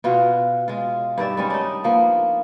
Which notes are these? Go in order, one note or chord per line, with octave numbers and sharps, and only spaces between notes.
B2 F4 F#4
G#3 F4
G2 D#3 D5 E5
G3 G#3 C#4
D4 D#4
F3 A#3 B3